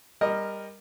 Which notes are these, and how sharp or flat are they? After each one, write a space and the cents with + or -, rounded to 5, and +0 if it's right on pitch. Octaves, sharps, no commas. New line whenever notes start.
G3 +20 A#4 +0 D#5 +0